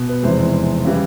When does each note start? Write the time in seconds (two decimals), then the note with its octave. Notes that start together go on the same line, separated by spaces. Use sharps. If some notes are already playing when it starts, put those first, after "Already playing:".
Already playing: B2
0.09 B4
0.23 F1 E2 C3 E3 G#3 C5
0.85 C#3 E3 G3